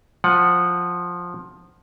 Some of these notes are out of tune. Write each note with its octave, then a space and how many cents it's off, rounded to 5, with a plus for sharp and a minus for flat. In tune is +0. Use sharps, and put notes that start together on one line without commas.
F3 +10 F#5 +0